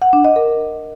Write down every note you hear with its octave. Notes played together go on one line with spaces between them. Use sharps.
F#5
D4
D#5
A#4